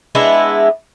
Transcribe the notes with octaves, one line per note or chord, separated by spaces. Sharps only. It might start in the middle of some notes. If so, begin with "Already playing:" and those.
G#3 B3 D4 E4